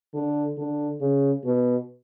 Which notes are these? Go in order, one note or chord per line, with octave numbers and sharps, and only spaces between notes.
D3
D3
C#3
B2